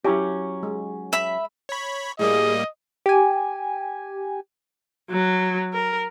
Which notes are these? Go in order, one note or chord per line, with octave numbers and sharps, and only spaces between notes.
F#3 C#4 E4 G4
G#3
E5 B5
C#5 B5
A2 G3 A#3 G#4 D#5
G4 G#5
F#3
A#4